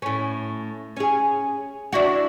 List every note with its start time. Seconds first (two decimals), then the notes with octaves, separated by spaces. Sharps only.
0.02 A2 C#4
0.97 C#4 G#4
1.93 D4 E4 F#4